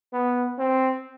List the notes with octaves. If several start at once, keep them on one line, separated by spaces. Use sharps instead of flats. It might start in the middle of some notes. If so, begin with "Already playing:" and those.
B3
C4